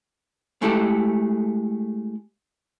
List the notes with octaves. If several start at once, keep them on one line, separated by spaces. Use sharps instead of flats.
G#3 A3 E4 G4 A4